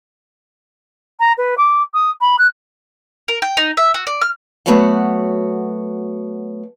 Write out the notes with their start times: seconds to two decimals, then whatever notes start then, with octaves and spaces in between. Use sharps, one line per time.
1.20 A#5
1.38 B4
1.58 D6
1.94 D#6
2.21 B5
2.39 F#6
3.28 A#4
3.42 G5
3.57 D#4
3.77 E5
3.94 F#4
4.07 D5
4.21 F6
4.66 F#3 A3 B3 F#4 C#5 F#5